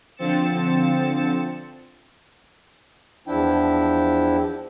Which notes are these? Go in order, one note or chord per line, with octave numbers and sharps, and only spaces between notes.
D3 F3 C4 A6 C#7 E7
E2 F3 D4 E4 G5